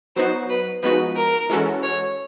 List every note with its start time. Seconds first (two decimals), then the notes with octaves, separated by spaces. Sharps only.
0.16 F#3 B3 D#4 F#4 C5
0.50 B4
0.83 F3 G#3 B3 D#4 F#4 B4
1.16 A#4
1.50 E3 G#3 C#4 F#4 A4
1.83 C#5